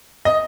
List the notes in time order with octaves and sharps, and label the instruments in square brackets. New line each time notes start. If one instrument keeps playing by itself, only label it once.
[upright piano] D#5